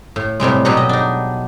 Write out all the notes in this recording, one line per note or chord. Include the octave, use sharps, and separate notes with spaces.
A2
A2 C3 G3 G#3
B2 F#3 B3 G4 G#4
D#5
D4 D#4